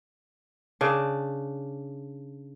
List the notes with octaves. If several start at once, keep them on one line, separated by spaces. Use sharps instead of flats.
C#3 D4